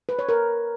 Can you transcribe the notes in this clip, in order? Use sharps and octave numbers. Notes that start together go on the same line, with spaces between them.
B4
C#5
A#4